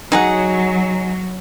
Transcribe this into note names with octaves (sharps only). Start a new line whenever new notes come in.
F#3 D#4 G#4 F#5